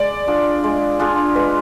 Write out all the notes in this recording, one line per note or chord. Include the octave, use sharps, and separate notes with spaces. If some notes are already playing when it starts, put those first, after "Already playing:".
Already playing: G#3 D5
D4 F4 G#4
G#3
D4 F4 G#4
G#3 B4